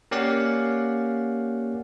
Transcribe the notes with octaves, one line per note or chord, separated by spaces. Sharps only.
A#3 C#4 G4 D5 F5 F#5